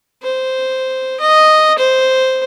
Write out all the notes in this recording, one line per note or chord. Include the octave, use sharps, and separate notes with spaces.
C5
D#5
C5